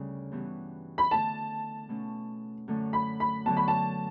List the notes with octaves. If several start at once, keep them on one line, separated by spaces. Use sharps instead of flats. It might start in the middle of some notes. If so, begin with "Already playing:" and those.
Already playing: D2 C#3 G3 C#4
G2 E3 G3 B3 F#4
B5
D3 A3 E4 A5
B2 A3 C#4
F#2 D3 A3
B5
B5
D3 F#3 B3 A5
B5
A5